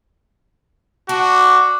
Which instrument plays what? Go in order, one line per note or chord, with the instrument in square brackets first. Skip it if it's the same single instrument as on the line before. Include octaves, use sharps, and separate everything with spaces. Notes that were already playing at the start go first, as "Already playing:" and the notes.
[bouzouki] D4 [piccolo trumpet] F#4